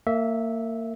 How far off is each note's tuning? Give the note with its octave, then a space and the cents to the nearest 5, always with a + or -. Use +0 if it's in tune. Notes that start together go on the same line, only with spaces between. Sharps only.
A#3 -30 E5 -10